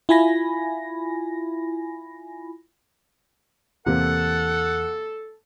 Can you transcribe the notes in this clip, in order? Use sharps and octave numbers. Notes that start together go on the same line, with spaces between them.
E4 F4 G#5 B5 A#6
E2 C3 E3 A#3 A4 F#5